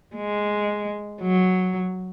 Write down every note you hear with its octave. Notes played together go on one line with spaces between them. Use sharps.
G#3
F#3